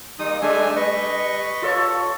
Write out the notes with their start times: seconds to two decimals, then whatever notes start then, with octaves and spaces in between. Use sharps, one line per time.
0.19 G3 A#3 D#4 D#6
0.42 G3 A3 D4 G#5
0.76 B4 D#5 C#6
1.62 F4 A4 C#5